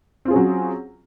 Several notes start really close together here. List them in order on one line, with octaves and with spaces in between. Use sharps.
C4 F4 G#4 C#4 F#3